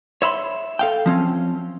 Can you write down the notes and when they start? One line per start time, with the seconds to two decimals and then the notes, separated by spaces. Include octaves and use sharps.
0.22 C#5 E5 B5 C6
0.79 A4 F5 G5
1.06 F3 C4 C#4